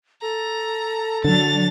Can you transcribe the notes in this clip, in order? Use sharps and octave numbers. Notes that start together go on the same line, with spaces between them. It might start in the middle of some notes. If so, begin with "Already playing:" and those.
A4 A#5
D3 F#3 D4 A6 F7